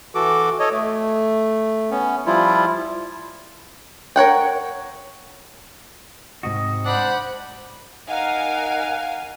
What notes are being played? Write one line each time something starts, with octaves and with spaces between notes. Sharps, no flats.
E3 F#4 A4 D6
A4 C#5 D#5
A3
B3 C#4
F3 G3 E4 F4
A#4 C#5 F#5 G5
G#2 C3 F#4 D#5
D4 C5 F#5 B5
D#4 A#4 D#5 F5 F#5 G#5